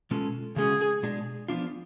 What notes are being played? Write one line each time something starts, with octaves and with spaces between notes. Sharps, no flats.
B2 G#3 C#4 F4 A4
C#3 G#3 C#4 F#4 G#4
B2 G#3 D4 G#4
F3 B3 D4 F4